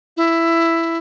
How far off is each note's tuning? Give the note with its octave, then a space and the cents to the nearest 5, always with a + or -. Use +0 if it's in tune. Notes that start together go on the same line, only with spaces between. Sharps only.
E4 +10